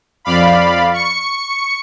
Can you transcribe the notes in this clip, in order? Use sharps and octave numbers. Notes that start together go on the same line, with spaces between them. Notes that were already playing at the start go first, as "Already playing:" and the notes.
F2 D5 F5 B5
C#6 C#7